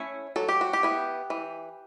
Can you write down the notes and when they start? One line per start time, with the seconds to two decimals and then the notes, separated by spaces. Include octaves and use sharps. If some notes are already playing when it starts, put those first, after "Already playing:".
Already playing: A3 C#4 E4 C#5
0.36 F#3 A4
0.49 G4
0.61 F#4
0.73 G4
0.83 B3 E4
1.30 E3